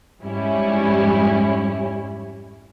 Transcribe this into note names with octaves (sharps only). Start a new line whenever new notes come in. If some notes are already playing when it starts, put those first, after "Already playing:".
F2 G#2 G3 C#4 E4